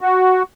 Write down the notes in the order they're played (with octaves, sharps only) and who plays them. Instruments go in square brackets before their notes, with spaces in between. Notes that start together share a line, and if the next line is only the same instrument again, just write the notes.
[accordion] F#4